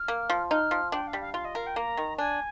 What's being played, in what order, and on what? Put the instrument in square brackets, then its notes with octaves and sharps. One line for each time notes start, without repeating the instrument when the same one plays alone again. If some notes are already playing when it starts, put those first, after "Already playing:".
Already playing: [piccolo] F6
[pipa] A#3
F3
[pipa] D#4 [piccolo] F6
[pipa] F3
[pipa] D4 [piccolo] G5
[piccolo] F5
[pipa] G3
[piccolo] F5
[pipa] F4 [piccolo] F5
[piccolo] D#5
[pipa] A#4 [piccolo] F5
[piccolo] G5
[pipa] A#3 [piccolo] A#5
[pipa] D#3
[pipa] D4 [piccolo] G#5